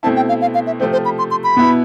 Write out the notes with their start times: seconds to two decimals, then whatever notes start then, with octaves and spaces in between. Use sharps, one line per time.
0.03 B2 A3 C4 E4 A5
0.16 G5
0.29 F5
0.41 F5
0.54 F5
0.67 E5
0.80 C3 F3 A3 C4 C5
0.93 C5
1.05 B5
1.18 C6
1.31 C6
1.44 B5
1.57 B2 B3 E4